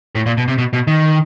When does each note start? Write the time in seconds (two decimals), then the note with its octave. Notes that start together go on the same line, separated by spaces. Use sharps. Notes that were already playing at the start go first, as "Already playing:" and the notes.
0.15 A2
0.26 A#2
0.37 B2
0.48 C3
0.58 B2
0.73 B2
0.87 D#3